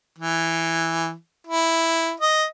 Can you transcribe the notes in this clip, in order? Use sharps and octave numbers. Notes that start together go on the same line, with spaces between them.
E3
E4
D#5